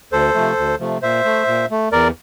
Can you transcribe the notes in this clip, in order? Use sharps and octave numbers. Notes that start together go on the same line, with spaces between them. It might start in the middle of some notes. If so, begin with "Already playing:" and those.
D2 A4 C5
C3 F3 A3
D2
C3 F3 A3
A#2 C5 E5
A3
A#2
A3
E2 A#4 D5